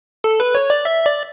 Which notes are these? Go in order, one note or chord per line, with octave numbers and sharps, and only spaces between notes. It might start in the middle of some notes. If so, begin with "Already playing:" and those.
A4
B4
C#5
D5
E5
D5